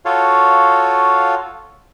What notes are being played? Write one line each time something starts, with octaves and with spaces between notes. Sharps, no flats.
F4 F#4 A4 C#5 F5